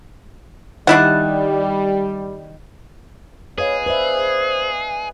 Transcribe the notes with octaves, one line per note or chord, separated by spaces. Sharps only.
D#3 G3 D4 E4 F#5 A5
G#4 B4 C#5 D#5 F5
B4 C5 D5 E5